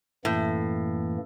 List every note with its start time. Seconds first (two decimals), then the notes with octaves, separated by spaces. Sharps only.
0.25 F#2 A2 E3 A#3